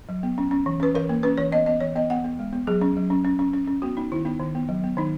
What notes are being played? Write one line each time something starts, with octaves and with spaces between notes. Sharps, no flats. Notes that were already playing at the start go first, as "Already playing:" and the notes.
F#3
B3
C#4
C#4
E3
C#4 B4
E3 A#4
A#3
C#4 B4
E3 C#5
B3 D#5
B3 D#5
E3 C#5
B3 D#5
B3 F#5
B3
G#3
B3
F#3 G#4
C#4
F#3
C#4
C#4
C#4
C#4
C#4
B3 F#4
B3 D#4
D#3 E4
B3 D#4
D#3
B3
F#3
B3
D#3 D#4